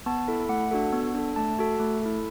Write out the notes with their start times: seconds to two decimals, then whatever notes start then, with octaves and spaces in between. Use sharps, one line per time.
0.06 B3 A5
0.28 E4 A4
0.49 A3 F#5
0.71 D4 F#4 A4
0.92 B3
1.15 D4 A4
1.36 A3 A5
1.59 F#4 A4
1.80 A3
2.02 E4 A4